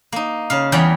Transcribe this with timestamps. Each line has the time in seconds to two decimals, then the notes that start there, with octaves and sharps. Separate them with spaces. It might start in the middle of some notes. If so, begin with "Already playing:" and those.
0.12 A#3 D#4
0.50 C#3 F5
0.72 E2 E3 G3 G5 A#5